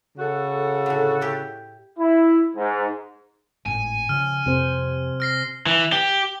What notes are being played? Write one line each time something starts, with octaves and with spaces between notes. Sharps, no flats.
C#3 F#4 A4
A2 D3
E4 G4
E4
G#2
G#1 A2 G#5
C#3 F3 F6
F2 C3 C5
F6 A#6 C7
E3
G4